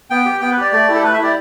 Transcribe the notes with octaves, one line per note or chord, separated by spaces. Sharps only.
B3 G5
G4
B3 G5
B4
G4 D5
A3 D5
E4 G4
A4
A3 B4
E5
E4 G4 D5